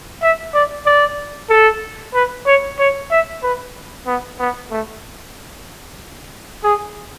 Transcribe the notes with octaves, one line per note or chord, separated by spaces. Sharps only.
E5
D5
D5
A4
B4
C#5
C#5
E5
B4
B3
B3
A3
G#4